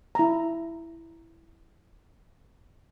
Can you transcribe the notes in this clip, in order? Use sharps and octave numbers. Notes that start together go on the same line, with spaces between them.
E4 A#5